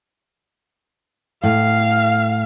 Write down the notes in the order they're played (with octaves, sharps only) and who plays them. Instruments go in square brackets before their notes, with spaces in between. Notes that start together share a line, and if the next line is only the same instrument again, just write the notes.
[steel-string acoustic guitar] A2 [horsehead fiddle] F5